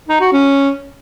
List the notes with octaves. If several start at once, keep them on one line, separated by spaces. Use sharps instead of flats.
D#4
F#4
C#4